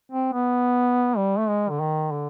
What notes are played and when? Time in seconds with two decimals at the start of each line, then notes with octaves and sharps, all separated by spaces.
0.12 C4
0.33 B3
1.17 G3
1.38 A3
1.48 G#3
1.70 D3
1.80 D#3
2.12 D3